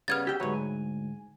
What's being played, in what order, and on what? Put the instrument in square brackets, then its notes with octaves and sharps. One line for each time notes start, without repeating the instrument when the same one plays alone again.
[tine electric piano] C#3 G3 B3 [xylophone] F6 G#6 A6
[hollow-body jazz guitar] G4 G5 [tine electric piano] E6
[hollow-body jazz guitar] D2 G#2 [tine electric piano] F#3 B4 C#5
[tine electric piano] G#5